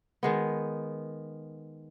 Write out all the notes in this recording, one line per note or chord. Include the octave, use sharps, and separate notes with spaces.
D#3 G#3 B3